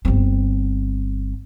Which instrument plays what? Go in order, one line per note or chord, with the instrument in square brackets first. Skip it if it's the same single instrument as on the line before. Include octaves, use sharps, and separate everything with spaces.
[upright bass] G1 C4